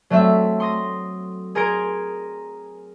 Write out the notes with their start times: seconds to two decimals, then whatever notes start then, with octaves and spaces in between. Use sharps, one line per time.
0.10 F#3 A3 C4 E5
0.60 C6 D#6 A#6
1.55 G#4 A#4 A#5 C6 G#6 D7